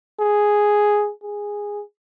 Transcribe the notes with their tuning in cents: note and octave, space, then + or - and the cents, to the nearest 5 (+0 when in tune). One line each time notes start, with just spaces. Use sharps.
G#4 +0
G#4 -10